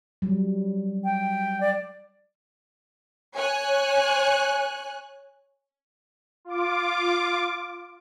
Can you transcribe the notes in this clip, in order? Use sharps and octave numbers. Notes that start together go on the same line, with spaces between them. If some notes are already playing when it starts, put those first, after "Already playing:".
F#3 G3
G5
D5
C#5 G#5 F#6
F4 D6